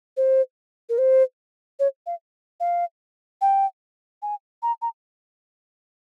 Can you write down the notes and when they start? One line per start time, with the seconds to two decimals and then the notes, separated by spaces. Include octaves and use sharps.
0.17 C5
0.89 A#4
0.98 C5
1.79 C#5
2.06 F5
2.60 F5
3.41 G5
4.22 G#5
4.62 A#5
4.82 A#5